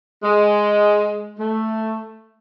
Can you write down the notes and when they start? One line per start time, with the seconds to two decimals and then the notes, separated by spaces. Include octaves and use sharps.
0.23 G#3
1.39 A3